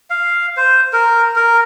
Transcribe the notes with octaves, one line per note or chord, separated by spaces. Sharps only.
F5
C5
A#4
A#4